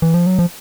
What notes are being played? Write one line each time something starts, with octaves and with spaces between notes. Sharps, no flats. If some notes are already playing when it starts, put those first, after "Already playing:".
E3
F3
F#3
F3